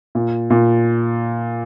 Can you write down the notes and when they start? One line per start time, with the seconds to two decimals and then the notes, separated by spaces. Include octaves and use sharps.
0.15 A#2
0.50 A#2